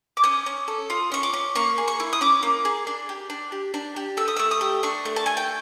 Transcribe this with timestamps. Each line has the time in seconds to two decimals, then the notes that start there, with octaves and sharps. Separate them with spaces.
0.17 D6
0.24 C#4 D#6
0.46 C#4
0.68 A4
0.90 F4 D#6
1.12 C#4 C#6
1.23 D6
1.33 C#4
1.55 A#3 C#6
1.78 G#4
1.88 C#6
2.00 E4
2.13 D#6
2.21 C#4 D6
2.43 A#3
2.65 G#4
2.87 D4
3.09 G4
3.30 D4
3.52 G4
3.74 D4
3.96 G4
4.17 A3 E6
4.28 D#6
4.37 A3 E6
4.51 D#6
4.61 G4
4.83 D4 C#6
5.05 A3
5.16 A5
5.26 A3 G#5
5.37 G5